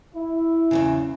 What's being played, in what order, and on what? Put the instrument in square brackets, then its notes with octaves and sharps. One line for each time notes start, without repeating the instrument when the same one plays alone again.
[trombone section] E4
[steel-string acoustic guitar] E2 A#2 C#3